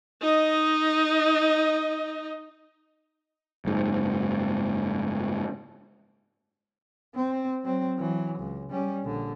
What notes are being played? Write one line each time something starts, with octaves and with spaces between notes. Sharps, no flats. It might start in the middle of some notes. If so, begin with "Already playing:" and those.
D#4 D#5
F#1 G#2
C4
F#3 C4
E3 F#3
C#2
G3 C#4
A#1 D3